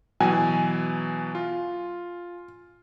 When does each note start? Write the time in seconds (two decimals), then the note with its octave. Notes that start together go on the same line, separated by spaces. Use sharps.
0.20 B2 E3 F#3 G#5
1.35 F4